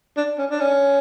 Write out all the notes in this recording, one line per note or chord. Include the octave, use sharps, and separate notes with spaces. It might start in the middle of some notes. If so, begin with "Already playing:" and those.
D4
C#4
D4
C#4